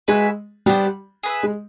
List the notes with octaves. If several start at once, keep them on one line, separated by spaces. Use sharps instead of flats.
G#3 F#4 B4 E5 G#5
G3 B3 D4 G4 C5
G#4 B4 E5
G#3